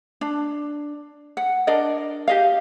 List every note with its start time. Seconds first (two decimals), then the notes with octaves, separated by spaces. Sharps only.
0.21 D4
1.37 F#5
1.67 D4 A#4 D5 D#5
2.28 G4 D#5 F5